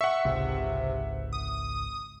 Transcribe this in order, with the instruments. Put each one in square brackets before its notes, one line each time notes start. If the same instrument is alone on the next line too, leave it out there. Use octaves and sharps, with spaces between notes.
[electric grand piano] E5 F#5 [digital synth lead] C#6
[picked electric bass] G#1 C#2 [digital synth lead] C3
[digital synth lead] D#6